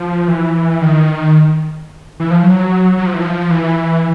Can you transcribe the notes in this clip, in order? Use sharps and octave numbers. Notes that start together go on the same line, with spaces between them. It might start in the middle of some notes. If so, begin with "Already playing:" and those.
Already playing: F3
E3
D#3
E3
F3
F#3
F#3
F3
E3
F3
E3